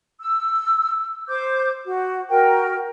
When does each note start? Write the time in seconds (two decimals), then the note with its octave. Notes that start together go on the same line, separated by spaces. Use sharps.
0.21 E6
1.28 C5 D6 G6
1.85 F#4
2.30 F#4 A#4 G5